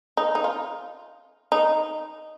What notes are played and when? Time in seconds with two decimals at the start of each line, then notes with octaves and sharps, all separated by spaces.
0.17 D#4
0.35 D#4
0.44 F4
1.52 D#4